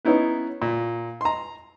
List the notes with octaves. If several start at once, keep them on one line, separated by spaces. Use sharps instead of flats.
B3 C#4 D#4 E4 B4
A#2
A#5 C6